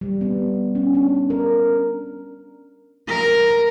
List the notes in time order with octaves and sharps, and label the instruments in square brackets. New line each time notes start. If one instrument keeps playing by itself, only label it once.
[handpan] G3
B3
C#4
D4
A#4
[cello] A#4